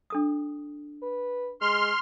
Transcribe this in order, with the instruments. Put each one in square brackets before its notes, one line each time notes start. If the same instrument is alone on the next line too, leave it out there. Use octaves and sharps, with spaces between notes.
[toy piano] D4 A4 D#6
[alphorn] B4
[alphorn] G#3 [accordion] C6 F6